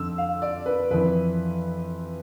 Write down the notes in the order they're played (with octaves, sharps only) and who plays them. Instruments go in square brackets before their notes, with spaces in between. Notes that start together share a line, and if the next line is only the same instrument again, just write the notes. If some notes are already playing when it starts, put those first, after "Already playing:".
Already playing: [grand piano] F2 D3 E6
F5
D5
B4
F2 E3 B4